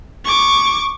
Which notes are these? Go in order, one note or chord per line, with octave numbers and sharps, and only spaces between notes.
C#6 D6